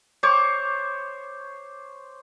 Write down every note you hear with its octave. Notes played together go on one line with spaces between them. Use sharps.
C5 C#5 C#6 D6